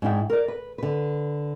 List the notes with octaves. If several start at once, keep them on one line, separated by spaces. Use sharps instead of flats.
G#2 D4 E4 G5
A#4 D5
B4
D3 B4